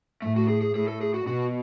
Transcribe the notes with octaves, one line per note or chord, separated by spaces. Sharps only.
A2 A3
F#4
G#4
G#4
A2 G#4
A4
G#4
F#4
B2 F#4